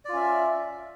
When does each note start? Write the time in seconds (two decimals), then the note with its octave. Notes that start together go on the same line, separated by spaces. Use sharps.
0.05 D5
0.09 F4
0.13 C#4
0.16 E5